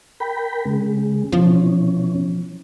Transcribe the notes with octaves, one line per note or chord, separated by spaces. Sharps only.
A#4 G5 B5
C#3 G#3
B2 E3 F3 C#4